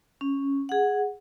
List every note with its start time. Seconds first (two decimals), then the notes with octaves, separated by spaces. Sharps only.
0.21 C#4
0.69 G#4 F#5